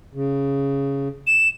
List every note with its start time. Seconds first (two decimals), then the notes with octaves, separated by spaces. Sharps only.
0.14 C#3
1.27 E7